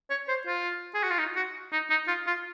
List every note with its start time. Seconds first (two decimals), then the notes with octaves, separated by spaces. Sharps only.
0.10 C#5
0.29 C5
0.47 F4
0.95 G#4
1.03 F#4
1.11 F4
1.19 D#4
1.36 F#4
1.73 D#4
1.90 D#4
2.08 F4
2.27 F4